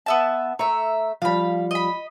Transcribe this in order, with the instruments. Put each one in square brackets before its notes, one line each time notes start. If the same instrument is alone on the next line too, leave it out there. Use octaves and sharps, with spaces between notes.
[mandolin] B3 E5 A5
[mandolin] A3 E5 [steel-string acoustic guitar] A#5
[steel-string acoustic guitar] F3 G3 [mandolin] F5 B5
[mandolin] D#5 B5